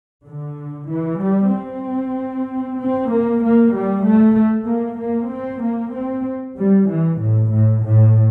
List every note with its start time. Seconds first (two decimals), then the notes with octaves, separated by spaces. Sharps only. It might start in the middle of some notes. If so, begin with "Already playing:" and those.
0.25 D3
0.88 E3
1.20 G3
1.52 C4
2.78 C4
3.10 A#3
3.42 A#3
3.73 G3
4.04 A3
4.68 A#3
5.00 A#3
5.31 C4
5.63 A#3
5.94 C4
6.58 G3
6.90 E3
7.21 A2
7.53 A2
7.85 A2